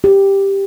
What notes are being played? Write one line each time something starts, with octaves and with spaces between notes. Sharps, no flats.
G4